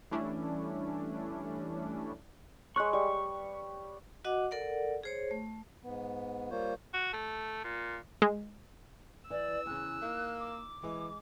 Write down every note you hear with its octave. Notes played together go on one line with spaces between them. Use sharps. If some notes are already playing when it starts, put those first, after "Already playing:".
E3 G3 A3 C#4 D4 E4
G#3 B4 C#5 C#6 F#6
G3 C#6
F#4 D#5 F#5 D6
A4 A#4 D5 F#5
G#4 C5 C#5
A3
G#2 B3
G3 A#3 F4 C5 C#5
F#4
A3
A#2
G#3
E3 D5 E6
E2 C#3 F#6
A#3 D#4
D6
E3 G#3